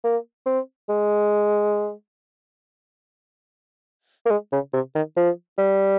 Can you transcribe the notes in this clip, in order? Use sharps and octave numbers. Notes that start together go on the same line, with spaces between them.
A#3
C4
G#3
A#3
G#3
C#3
C3
D#3
F3
G3